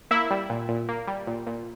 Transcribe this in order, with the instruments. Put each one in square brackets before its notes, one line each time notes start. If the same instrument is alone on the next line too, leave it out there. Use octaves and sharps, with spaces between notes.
[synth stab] A#3 E4 E5
G3
A#2
A#2
A#3
G3
A#2
A#2